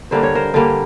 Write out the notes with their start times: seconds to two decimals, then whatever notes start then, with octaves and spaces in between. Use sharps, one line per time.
0.11 D3 G3 A#3 C5
0.23 C#5
0.35 A#4 C5
0.54 D3 G3 A#3